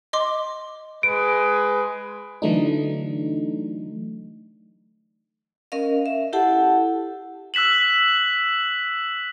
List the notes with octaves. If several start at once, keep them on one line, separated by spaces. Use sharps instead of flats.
D#5 C6 D6
G#3 B4 D7
D3 E3 F#3 A3 D4 D#4
C#4 A#4 D#5 F5
E5
E4 G4 A4 F#5 A5
E6 F#6 B6 E7 F#7